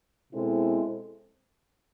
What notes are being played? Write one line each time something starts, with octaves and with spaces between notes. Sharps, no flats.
B2 G#3 C4 E4 A4